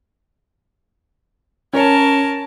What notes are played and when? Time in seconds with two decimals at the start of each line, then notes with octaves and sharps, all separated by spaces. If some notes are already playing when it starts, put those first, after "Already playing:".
1.73 C#4 A#4 C#5 A5